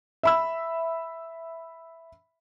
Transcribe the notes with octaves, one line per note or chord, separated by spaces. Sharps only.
E5 B5 E6